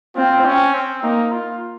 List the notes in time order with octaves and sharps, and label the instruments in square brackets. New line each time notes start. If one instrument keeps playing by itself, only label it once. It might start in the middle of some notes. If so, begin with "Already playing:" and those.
[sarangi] C4 [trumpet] F4
[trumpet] C#4
C4
[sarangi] A#3 [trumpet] D#4
[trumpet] F4